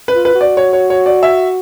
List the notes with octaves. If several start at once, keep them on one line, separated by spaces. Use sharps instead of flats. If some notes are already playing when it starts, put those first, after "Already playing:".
B4
F4
B4
F#4
D5
C#5
C#5
C#5
D5
E5